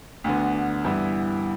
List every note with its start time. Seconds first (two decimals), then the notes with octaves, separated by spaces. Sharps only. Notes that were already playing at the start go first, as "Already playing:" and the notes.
0.24 D2 D3 B3
0.84 G2 E3 B3 E4